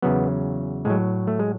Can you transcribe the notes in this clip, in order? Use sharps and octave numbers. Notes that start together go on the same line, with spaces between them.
E2 C#3 F#3 B3
A2 F#3 G#3
A3
G#3